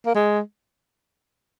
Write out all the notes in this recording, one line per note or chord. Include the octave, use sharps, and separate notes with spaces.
A#3
G#3